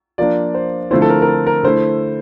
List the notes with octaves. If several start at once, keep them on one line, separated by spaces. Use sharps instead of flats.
F3 A#3 D4 D5
C5
D3 F3 A3 C4 E4 C5
A4
A#4
A#4
A4
A#4
D3 A3 E4 C5